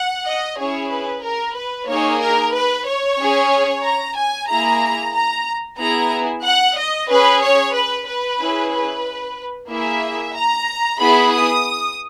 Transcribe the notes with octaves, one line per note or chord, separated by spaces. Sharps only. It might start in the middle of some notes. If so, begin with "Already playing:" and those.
Already playing: F#5
D#5
C#4 E4 G#4 C#5
B4
A#4
B4
A#3 D#4 G#4 C#5
A#4
B4
C#5
C#4 G#4
A#5
G#5
A#3 E4 G#4 A#5
A#5
B3 E4 G#4 A#5
F#5
D#5
C#4 G#4 B4
C#5
B4
B4
C#4 E4 G#4
B4
A#3 E4 G#4 E5
A#5
B3 E4 G#4 B5
D#6